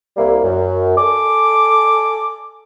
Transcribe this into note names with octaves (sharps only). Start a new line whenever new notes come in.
C2 G3 A#3 E4
F#2
A4 G#5 D6